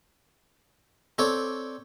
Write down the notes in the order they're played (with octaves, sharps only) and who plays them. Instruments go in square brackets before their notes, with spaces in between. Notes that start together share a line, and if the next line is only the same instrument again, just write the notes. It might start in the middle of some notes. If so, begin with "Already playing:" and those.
[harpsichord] C4 A4 C#5 D5